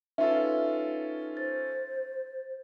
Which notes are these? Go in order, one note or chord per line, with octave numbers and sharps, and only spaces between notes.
C#4 D#4 F4 A4 B4 E5
C5 A6